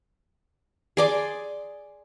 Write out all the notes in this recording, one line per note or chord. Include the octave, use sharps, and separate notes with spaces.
G#4 D5 C6